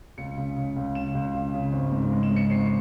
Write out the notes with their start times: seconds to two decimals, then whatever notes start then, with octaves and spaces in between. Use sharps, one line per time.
0.18 C#2 C#7
0.37 C#3
0.56 C#3
0.76 C#2
0.95 C#3 E7
1.15 C#2
1.34 C#3
1.54 C#3
1.73 G#1
1.92 G#2
2.12 G#3
2.23 E7
2.31 G#3
2.36 C#7
2.50 G#1 C7